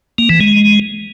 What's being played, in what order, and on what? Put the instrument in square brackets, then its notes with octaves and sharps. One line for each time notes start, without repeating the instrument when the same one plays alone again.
[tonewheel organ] A#3
E3
G#3